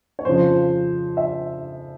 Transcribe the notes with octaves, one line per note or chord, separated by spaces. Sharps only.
C#5
F2 C#3 F3 C5
E5